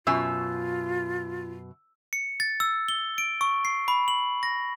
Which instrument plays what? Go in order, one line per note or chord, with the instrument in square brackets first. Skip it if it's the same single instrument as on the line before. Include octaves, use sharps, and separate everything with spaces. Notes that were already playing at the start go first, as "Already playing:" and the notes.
[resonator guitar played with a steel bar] F#2 B2 G#5 [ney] F4 [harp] E6
[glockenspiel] C#7
A6
E6
G7
D7
C#6
C7
B5
F#7
A#6